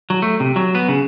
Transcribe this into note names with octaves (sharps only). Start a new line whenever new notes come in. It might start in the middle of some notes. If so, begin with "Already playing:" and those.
F#3
A3
C3
F#3
B3
C#3